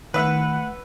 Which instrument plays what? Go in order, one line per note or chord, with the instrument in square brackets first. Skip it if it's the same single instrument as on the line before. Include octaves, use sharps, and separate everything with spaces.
[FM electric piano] D#3 [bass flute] A3 [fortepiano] B4 E5 [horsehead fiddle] F#5